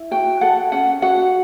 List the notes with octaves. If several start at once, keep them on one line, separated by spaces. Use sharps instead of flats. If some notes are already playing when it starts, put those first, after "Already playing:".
Already playing: E4
F#4 G5
A4 F#5
C#4 F#5
F#4 F#5